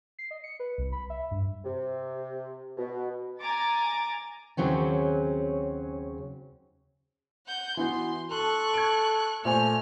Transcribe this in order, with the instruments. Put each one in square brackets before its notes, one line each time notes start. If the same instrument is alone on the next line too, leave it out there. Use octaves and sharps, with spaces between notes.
[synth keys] C7
D#5
C#7
B4
C2
B5
E5
G2
[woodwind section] C3
B2
[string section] G#5 A#5 D6 A6
[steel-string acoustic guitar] D#2 C#3 F#3 C4 C#4
[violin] F#5 G6
[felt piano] E3 B3 F#4 [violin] C6
[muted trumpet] A4 [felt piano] C6 [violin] C#6 F#6
[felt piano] G#6 D7
[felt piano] A#2 C5 G#5 [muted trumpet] A3 [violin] F6